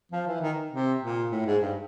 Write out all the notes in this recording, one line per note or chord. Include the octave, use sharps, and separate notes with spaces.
F3
E3
D#3
C3
A#2
A2
G#2
G2